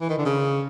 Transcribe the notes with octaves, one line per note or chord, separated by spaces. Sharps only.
E3
D#3
D3
C#3